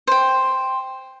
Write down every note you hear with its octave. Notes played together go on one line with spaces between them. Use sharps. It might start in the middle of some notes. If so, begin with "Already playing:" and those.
C5 G5